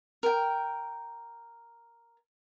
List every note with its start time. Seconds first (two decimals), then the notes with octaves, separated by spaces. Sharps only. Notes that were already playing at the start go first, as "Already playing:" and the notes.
0.23 A#4 G5